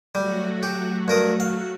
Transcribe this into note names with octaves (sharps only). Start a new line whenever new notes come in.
F#3 G3 A3 F#4
G4
G2 A#4 D#6
F5